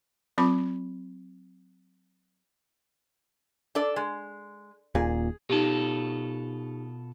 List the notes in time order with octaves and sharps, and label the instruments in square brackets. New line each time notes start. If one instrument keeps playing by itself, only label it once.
[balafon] F#3 C4 F4 B5 D6
[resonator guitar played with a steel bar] D4 A4 D5
G#3
[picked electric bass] D#1 A#2 [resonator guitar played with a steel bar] G#4
[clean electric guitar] B2 F4 A4 [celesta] D#4 G4